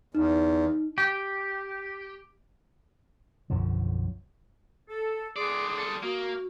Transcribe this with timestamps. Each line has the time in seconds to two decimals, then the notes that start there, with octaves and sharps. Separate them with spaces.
0.15 E2 D#4
0.98 G4
3.50 B1 F#2 D3 F3
4.89 A4
5.36 A2 G#4 D5 C6 D#6
5.78 G3 A4
6.03 A#3 F#4